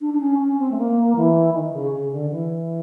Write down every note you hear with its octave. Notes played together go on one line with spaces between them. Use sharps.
D4
D4
C#4
C#4
C4
A3
A#3
E3
D#3
C#3
C#3
D3
E3